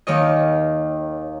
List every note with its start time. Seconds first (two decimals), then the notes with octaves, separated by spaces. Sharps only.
0.07 D#2 D#3 C#5 D#5